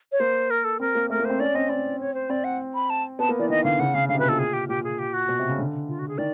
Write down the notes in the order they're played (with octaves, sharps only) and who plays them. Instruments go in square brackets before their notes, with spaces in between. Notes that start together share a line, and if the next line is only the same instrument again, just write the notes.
[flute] C#5
[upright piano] A#3 [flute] C5
[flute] A#4
A4
[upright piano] C4 [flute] A#4
[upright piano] A#3
[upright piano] A3 [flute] A#4
[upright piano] A#3
[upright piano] C4 [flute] C5
[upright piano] C#4 [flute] D5
[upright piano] C4 [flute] D#5
[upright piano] C4 [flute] D5
[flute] C#5
C5
[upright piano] C4 [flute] D5
[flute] F#5
B5
A5
[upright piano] B3 [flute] A5
[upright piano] A#3
[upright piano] E3 [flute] D5
[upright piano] D#3 [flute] D#5
[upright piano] D3 [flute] F5
[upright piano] C#3 [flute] F#5
[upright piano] C#3 [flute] F5
[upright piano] D3 [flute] F5
[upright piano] C3
[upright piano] B2 [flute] B4
[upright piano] A#2 [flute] A4
[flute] G#4
G4
[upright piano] A#2 [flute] G4
[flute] G#4
G4
F#4
[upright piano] B2
C3
C#3
D3
[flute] F4
F#4
G#4
[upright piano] D#3 [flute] D5